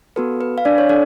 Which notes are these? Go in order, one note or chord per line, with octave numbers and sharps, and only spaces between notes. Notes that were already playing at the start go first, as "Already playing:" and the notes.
B3 F#4 A4 B4
B4
F5
D4 D5
C#5
D4 A4 D5